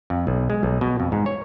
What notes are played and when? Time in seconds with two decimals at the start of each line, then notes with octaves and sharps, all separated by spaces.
0.10 F2
0.27 B1
0.50 G#3
0.63 B1
0.81 B2
1.00 F2
1.12 G#2
1.26 C#5